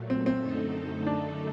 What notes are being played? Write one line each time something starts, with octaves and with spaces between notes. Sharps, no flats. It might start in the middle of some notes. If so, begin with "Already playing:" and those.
Already playing: A#2 F#3 A3
C4
C4
F#2 D3 A3 D#4 A4
D4